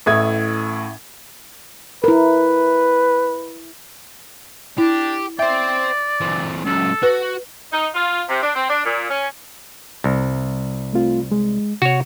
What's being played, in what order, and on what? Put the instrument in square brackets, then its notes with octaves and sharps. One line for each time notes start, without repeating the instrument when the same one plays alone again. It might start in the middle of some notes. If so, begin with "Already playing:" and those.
[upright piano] A1 A2 E5 D#6 G#6
[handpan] E4 A#4 [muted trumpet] B4
[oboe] D4 [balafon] E4 [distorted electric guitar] G4
[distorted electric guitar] C5 G5 [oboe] D5 [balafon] E5
[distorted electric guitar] E3 C4
[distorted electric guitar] C#2 F#2 [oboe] A4
[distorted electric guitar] F#4 [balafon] B4
[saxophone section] D#4
F4
C3
D4
C4
D4
A#2
C#4
[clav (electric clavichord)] C2
[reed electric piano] A3 C4 F4
G#3
[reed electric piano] C3 [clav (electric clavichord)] F#4 C#5